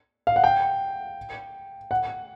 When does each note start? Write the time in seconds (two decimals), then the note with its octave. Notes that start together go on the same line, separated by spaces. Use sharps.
0.27 F5
0.36 F#5
0.44 G5
1.91 F#5